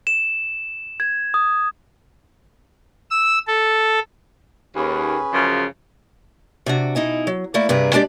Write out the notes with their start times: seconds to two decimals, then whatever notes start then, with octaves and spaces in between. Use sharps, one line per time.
0.07 E7
1.00 G#6
1.34 D#6
3.10 E6
3.47 A4
4.76 D#2 C#4 G#4 B4
5.33 F#2 C#3 F3
6.66 C3 D4 F#4
6.95 B2 D#4 E4 G#5
7.27 F#3
7.54 A3 A#3 E4 D5
7.69 G2 C3 G#4 B4 A#5
7.93 G#3 D4 G4 D5